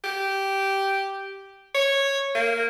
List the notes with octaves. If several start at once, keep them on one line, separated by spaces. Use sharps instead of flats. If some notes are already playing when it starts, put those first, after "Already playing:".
G4
C#5
A#3